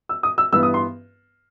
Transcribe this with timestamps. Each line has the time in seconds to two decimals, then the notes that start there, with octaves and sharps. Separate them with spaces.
0.09 E6
0.23 D#6
0.38 E6
0.53 G2 E3 B3 E6
0.63 D#6
0.74 C6